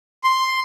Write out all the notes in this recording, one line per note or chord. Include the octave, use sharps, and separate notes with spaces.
C6